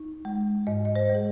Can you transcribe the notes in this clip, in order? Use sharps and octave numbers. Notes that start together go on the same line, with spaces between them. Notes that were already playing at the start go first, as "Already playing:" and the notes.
Already playing: D#4
G#3
G#2 D#5
D#5
C5
G#3
G#4